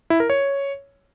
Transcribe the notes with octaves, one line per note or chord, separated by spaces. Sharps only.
E4
A#4
C#5